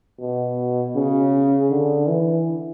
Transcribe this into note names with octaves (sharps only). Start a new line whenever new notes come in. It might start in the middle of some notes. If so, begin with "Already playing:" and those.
B2
C#3
D3
E3